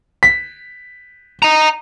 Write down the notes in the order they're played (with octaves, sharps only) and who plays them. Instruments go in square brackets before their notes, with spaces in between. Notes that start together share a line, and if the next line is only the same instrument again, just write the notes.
[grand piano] B6
[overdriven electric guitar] D#5 A#5